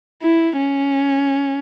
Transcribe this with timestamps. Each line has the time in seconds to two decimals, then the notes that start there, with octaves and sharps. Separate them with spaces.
0.23 E4
0.57 C#4